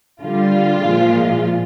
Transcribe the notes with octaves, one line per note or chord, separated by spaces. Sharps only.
D3 G3 F4
A#2 F3 G#3